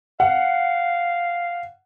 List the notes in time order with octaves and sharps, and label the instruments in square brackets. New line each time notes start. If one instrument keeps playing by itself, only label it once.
[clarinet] F5 [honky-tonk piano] F#5